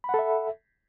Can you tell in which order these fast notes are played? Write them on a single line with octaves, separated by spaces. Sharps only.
B5 F#5 A4 E5